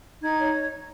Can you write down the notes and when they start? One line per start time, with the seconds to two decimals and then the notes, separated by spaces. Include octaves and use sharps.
0.22 D#4 G#6
0.38 C#5